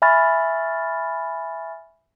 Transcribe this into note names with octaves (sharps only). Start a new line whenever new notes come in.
E5 G#5 B5 C#6 F6 A6